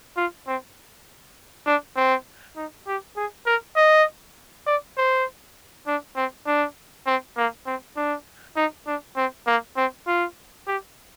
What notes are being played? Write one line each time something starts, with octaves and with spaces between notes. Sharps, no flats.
F4
C4
D4
C4
D#4
G4
G#4
A#4
D#5
D5
C5
D4
C4
D4
C4
A#3
C4
D4
D#4
D4
C4
A#3
C4
F4
G4